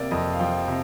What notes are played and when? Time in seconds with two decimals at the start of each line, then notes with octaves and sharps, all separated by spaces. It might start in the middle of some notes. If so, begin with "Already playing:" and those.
Already playing: C3 A#3 D5
0.11 F2 D#5
0.33 F5
0.40 F3 G5
0.68 C3